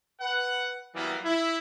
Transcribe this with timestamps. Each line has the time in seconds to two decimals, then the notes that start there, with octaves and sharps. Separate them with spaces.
0.20 B4 F#5
0.94 E3 F#3 G3 A#3 B3
1.24 E4